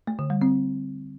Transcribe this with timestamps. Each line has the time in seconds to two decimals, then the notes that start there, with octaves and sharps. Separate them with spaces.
0.07 A3
0.19 D3
0.30 G3
0.41 C4